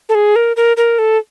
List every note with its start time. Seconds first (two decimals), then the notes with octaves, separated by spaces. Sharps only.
0.09 A4
0.15 G#4
0.36 A#4
0.56 A#4
0.77 A#4
0.99 A4